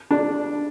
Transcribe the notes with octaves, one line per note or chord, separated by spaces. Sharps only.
D4